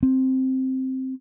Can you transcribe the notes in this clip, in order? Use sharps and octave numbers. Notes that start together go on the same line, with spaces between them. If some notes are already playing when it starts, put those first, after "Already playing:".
C4